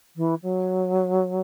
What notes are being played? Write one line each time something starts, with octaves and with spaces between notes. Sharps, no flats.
E3
F#3